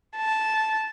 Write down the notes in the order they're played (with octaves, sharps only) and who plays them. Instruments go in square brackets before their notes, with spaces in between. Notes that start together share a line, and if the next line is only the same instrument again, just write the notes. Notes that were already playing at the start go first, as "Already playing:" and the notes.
[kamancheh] A5